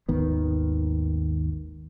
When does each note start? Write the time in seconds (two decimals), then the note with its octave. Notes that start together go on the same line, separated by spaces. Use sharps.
0.09 G#1 D#2 D#3 B3